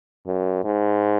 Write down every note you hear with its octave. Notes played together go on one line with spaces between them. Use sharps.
F#2
G#2